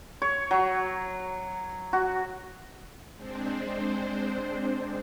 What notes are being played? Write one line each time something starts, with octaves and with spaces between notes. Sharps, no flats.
C#5
F#3
F#4
G#3 C4 D4 C5